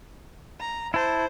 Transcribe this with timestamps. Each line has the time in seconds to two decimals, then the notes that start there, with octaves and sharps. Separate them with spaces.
0.60 A#5
0.94 E4 C5 A5